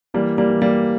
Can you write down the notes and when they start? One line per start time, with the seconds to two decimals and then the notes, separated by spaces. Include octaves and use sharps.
0.14 E3 G3 A#3
0.38 G3 A#3
0.50 E3
0.62 G3 A#3